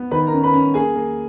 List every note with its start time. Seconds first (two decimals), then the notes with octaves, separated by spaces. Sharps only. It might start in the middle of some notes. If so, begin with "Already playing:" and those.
Already playing: B3
0.11 D#3 B4 B5
0.27 A#4 A#5
0.33 C#4
0.43 B4 B5
0.53 C#4
0.74 A#3 G#4 G#5
0.96 A#3